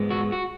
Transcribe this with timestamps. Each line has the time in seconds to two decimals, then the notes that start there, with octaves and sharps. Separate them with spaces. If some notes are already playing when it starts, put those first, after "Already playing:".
Already playing: G#2 G#3 B3
0.11 F#4
0.32 F#4